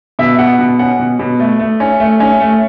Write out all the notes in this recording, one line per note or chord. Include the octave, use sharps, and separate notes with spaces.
B2 E5
B2 F#5
B2
C#4 F#5
B2
B2
A3
A3
C#4
A3
C#4
A3